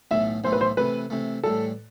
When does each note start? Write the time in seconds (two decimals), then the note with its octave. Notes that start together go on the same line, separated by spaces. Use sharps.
0.11 B1 A2 E3 A3 E5
0.44 B1 A2 E3 A3 C5
0.53 B4
0.61 C5
0.77 C3 E3 A3 B4
1.10 C3 E3 A3
1.44 A2 E3 G3 A4